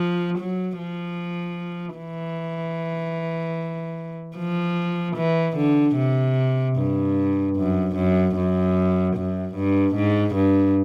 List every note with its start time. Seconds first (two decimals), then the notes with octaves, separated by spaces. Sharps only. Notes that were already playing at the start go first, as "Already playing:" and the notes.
Already playing: F3
0.39 F#3
0.78 F3
1.97 E3
4.37 F3
5.17 E3
5.57 D3
5.96 C3
6.77 G2
7.56 F#2
7.96 F#2
8.36 F#2
9.16 F#2
9.56 G2
9.96 G#2
10.35 G2